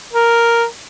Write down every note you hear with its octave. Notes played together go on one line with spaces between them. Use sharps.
A#4